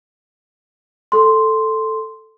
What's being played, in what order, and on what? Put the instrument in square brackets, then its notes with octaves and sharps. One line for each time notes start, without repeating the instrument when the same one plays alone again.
[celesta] A4 C6